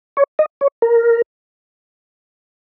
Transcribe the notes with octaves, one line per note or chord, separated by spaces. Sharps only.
C#5
D#5
C#5
A#4